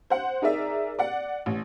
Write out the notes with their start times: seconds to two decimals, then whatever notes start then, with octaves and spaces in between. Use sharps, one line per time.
0.10 C5 F#5
0.42 D#4 G#4 A#4 D5 E5
0.99 D5 F#5
1.46 A1